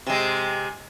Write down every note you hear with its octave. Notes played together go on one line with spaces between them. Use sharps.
C3 G#3